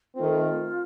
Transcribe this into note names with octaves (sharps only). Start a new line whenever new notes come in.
D#3 A3 C4 F4